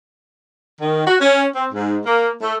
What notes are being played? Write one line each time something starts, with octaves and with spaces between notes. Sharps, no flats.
D#3
F#4
C#4
C4
G#2
A#3
A3